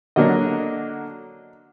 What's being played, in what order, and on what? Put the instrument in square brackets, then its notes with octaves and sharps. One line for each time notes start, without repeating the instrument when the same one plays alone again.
[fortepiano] D3 F#3 A#3 D4 D#5